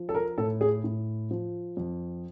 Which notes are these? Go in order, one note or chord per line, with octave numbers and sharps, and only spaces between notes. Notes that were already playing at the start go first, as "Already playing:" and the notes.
Already playing: F3
A4
A#4
A2 A4
G#4
A2
F3
F2